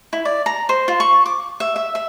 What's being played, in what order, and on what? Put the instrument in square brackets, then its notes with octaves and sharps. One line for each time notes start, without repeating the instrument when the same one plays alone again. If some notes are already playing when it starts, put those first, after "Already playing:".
[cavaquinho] E4
D5
A#5
C5
F4
C#6
D6
E5
E5
E5